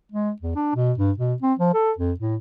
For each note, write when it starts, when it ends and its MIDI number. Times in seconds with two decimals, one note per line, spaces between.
0.12 0.31 56
0.41 0.55 40
0.56 0.71 62
0.75 0.93 47
0.98 1.11 43
1.18 1.34 47
1.42 1.53 60
1.59 1.71 53
1.74 1.92 69
1.98 2.12 41
2.19 2.36 45